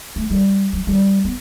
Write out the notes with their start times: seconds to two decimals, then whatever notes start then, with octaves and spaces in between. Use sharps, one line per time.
0.16 A3
0.30 G3
0.73 F#3
0.87 G3
1.24 B3